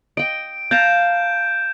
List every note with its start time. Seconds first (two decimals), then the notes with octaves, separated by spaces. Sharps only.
0.17 D#5 G5 D7
0.71 F5 A5 A#5 G6 E7